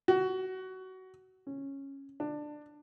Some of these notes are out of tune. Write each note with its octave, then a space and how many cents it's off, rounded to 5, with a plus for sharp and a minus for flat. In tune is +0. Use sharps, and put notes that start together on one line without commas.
F#4 +20
C#4 -10
D4 +15